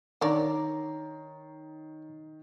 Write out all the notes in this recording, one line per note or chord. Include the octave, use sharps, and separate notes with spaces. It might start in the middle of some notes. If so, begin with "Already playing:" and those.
D#3 D4 A#4 C#5 D5 A#5